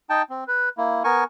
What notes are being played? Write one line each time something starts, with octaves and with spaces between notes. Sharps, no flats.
D#4 G5 A5
C4
B4
A#3 E4
B3 A#4 G#5 C#6